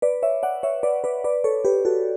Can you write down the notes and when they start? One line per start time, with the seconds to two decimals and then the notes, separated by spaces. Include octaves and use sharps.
0.02 B4 D5
0.23 C#5 E5
0.43 D5 F#5
0.63 C#5 E5
0.83 B4 D5
1.04 B4 D5
1.24 B4 D5
1.44 A4 C#5
1.65 G4 B4
1.85 F#4 A4